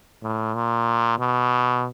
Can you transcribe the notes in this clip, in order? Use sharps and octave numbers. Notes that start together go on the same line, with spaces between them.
A2
A#2
B2